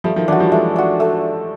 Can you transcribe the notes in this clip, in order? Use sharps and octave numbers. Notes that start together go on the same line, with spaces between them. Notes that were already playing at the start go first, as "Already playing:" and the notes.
F3 G3 A3
D#3 F3
E3 F#3 D4 F#4
F3 G3
F#3 G#3 A3
D4 F#4
A3